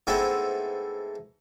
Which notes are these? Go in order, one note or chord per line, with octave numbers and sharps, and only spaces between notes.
G#2 A3 B3 C4 E4